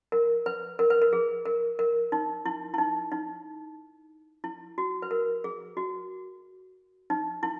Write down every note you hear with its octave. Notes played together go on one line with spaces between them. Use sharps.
A#4
B4
A#4
B4
A#4
G#4
A#4
A#4
D#4
E4
E4
D#4
D#4
E4
F#4
B4
A#4
G#4
F#4
D#4
E4